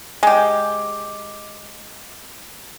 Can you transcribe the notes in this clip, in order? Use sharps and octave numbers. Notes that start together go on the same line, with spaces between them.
G#3 G4